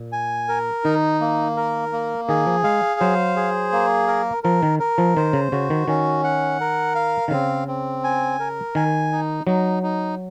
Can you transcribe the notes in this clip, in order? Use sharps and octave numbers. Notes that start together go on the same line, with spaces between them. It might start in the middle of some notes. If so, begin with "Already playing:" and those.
Already playing: A#2
G#5
A#4
D#3 D#4
A#3
A#4
A#3
D#3 G#4
F3
G#3 F5
F#3 C5
G#4
A#3
A#4
F3 A#4
D#3
A#4
F3
D#3 C5
C#3
C#3 F#4
D#3
D#3 C#4
F#5
A#4
F5
D#3
C#3 C4
C4
G#5
A#4
D#3 G#5
D#4
F#3 D#4
D#4